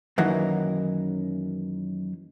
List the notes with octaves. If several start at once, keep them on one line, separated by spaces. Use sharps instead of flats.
F#2 D#3 E3 F#3 A#3